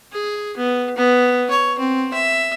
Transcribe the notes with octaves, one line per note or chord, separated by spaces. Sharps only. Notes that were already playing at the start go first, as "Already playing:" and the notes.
G#4
B3
B3
C#5
C4
E5